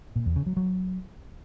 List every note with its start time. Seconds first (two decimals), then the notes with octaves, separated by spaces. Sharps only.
0.16 A#2
0.26 E2
0.36 C#3
0.46 F#3
0.57 F#3